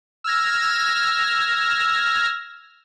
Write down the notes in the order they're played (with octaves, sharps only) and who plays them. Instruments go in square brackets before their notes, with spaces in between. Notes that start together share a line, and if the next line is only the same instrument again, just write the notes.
[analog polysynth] E6 F6 G#6 A#6